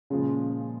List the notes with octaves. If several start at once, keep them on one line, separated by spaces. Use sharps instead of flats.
A#2 C#3 F3 G#3 F4